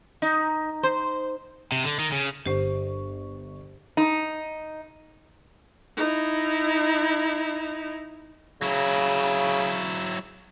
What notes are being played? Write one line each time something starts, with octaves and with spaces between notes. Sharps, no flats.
D#4
C5
C3
D3
D#3
C#3
G1 G4 C5 C#6
D#4
D#4 E4
C#3 F#3 E4